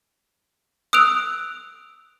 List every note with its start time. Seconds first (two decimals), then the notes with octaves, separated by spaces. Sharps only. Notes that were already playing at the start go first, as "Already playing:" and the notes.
0.93 D#6 E6 F#6 D7 F7